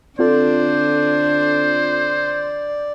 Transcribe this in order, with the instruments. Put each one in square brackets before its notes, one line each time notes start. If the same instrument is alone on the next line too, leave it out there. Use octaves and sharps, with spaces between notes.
[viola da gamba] D3 D4 [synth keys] C4 F4 A4 [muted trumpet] C5 [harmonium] D5